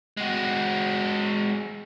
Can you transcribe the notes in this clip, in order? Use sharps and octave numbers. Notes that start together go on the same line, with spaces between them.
G#3 F#4